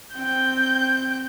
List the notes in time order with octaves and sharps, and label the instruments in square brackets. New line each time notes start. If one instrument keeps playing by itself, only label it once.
[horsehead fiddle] C4 G5 [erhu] G6